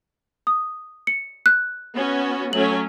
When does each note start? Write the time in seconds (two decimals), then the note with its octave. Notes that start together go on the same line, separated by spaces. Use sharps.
0.47 D#6
1.07 C#7
1.46 F#6
1.94 B3 C#4 F#4
2.53 F#3 A3 C#4 F#7